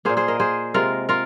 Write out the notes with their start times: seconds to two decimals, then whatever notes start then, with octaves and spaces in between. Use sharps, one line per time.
0.05 A#2 A#3 G#4 C5
0.17 G#4 C5
0.28 A#4 D#5
0.40 G#4 C5
0.74 C3 G#3 F4 A#4
1.09 F4 A#4